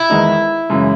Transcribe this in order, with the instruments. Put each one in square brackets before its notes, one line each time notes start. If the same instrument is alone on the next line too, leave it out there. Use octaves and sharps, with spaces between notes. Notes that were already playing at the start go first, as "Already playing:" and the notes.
Already playing: [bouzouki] E4
[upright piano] E2 D#3 G#3 D#4
F#2 C#3 E3 G#3